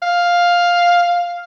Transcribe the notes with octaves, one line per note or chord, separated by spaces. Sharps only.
F5